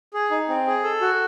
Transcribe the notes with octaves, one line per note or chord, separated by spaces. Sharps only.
G#4
D#4
C4
G#4
A4
F#4